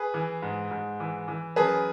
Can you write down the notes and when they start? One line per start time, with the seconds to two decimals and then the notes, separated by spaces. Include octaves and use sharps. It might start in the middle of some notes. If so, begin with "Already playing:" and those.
Already playing: G#4 B4
0.14 E3
0.42 G#2
0.71 G#2
1.00 E3
1.28 E3
1.56 F#2 G#4 B4